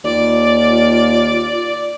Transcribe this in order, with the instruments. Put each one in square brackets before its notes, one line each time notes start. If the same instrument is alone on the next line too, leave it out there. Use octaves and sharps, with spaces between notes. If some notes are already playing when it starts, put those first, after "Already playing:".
[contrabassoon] D#2 [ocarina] F4 [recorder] D5